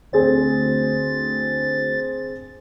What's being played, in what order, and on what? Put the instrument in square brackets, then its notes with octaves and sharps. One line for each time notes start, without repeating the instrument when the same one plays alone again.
[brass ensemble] D2 [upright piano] C4 G#4 [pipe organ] A6